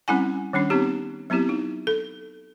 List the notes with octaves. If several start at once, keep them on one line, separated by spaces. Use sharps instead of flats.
G3 C4 C#4 E4 F#5 G#5
D#3 G3 C#4 D4
B3 C4 D#4 G4
F#3 B3 C4 E4 G4
D#4
A4